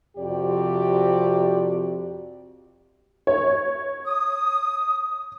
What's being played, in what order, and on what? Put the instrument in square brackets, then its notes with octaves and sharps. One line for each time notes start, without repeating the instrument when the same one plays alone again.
[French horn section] F2 C3 F#4 G4 D5
[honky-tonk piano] C#5
[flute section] D#6